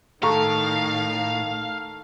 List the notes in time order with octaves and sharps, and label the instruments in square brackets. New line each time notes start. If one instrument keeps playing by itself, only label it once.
[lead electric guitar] A2 [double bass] D#3 [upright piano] A4 A#5 C#6 [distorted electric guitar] F5